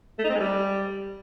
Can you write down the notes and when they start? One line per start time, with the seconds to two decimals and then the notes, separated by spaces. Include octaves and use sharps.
0.19 A3
0.24 D#4
0.29 C4
0.35 G#3
0.40 G3